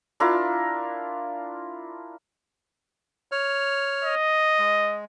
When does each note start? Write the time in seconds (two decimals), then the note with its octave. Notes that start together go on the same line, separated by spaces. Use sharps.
0.20 D4 E4 F4 A#4
3.32 C#5 F6
4.05 D#5
4.59 G#3